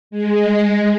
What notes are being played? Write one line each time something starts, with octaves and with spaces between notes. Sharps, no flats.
G#3